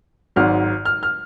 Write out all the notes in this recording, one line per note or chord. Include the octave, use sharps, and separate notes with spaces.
G#1 G#2 F#3 F6
F6
F6